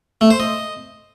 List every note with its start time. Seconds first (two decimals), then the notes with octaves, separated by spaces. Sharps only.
0.21 A3
0.30 C5
0.40 D#5